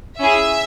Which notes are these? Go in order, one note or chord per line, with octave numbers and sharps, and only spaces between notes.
C#4 E4 G#4 E5